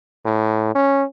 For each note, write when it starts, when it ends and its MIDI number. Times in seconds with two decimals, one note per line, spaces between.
0.25 0.70 45
0.75 1.04 61